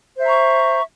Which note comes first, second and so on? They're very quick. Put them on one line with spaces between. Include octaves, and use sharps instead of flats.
C5 E5 A#5 C#6